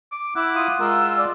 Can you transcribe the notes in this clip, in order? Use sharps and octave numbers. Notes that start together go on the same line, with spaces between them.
D6
E4 F#5 D6 E6
F4 D#6
G#3 F4 A#4 E6
D5